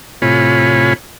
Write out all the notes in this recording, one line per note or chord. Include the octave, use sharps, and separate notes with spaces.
A2 C3 F4 C#5 G#5 B5